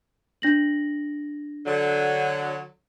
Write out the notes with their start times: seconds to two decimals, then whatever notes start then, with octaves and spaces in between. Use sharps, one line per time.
0.42 D4 A#6 F#7
1.66 D3 F#3